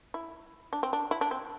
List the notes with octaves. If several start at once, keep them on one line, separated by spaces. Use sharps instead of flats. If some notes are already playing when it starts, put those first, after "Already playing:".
E4
D4
C4
D4
E4
D4
C4